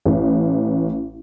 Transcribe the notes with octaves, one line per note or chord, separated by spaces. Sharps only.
A1